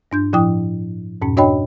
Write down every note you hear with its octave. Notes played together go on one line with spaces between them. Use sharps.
G2 D4 G6
A2 F3 E4 G5 D#6
F2 G#2 B2 C#4
D4 F#4 C#5 D#5 G5 B5